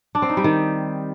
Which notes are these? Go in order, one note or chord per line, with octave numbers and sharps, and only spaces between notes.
D4
C4
D#4
G3
D#3